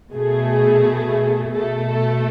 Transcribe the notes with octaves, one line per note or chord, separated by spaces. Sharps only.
B2 A3 G#4
B2 A3 A4
A4